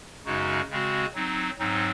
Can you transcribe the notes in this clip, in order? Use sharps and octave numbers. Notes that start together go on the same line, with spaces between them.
F#2 C#3 G#3 D#4 F#4
C#3 G#3 C4 F#4
F#3 C4 D#4
G#2 F#3 C4 D#4